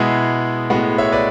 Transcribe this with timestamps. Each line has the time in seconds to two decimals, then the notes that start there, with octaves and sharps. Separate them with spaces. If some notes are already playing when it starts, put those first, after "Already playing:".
Already playing: B2 G#3 B3 E4 G#4
0.70 A2 G#3 B3 F#4
0.98 C#5 E5
1.12 B4 D5